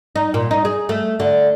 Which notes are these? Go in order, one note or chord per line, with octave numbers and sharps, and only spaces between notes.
D#4
A#2
D#4
G#4
A3
D3